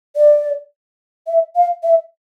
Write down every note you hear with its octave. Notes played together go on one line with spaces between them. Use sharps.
D5
E5
F5
E5